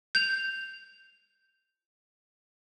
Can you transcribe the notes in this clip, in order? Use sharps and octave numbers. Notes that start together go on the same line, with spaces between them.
G6 F7